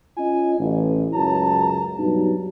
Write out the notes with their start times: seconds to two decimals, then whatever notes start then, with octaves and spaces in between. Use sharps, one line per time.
0.18 C#4 F4 D#5 G#5
0.59 A1
1.14 C#2 F#2 A5 A#5
1.98 G2 B2 F#3 D#4